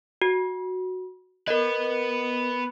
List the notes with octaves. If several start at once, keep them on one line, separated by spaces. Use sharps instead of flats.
F#4
B3 A#4 B4 D#5